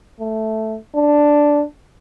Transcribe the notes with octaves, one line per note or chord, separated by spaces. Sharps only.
A3
D4